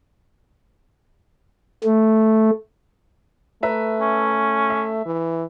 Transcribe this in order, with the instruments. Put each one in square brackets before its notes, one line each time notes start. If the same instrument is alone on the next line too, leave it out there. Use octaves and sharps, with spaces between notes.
[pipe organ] A3
[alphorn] A3 [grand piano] B4 E5 A#5
[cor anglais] C#4
[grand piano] E5
[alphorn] E3